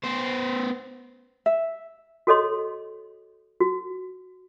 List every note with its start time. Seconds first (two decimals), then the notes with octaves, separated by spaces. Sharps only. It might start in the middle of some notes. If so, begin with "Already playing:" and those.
0.04 B3 C5
1.46 E5
2.27 F#4 G#4 A4 C#5 D#5 C6
3.60 F#4